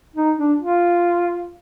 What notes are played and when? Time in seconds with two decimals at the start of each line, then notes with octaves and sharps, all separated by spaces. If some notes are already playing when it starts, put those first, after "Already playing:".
0.16 D#4
0.38 D4
0.59 F4